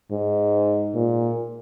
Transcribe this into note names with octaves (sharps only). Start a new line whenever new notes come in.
G#2
A#2